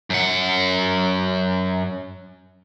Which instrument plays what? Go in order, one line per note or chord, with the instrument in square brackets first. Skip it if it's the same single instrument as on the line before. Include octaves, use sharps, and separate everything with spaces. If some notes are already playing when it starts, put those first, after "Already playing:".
[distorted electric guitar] F#2 F#5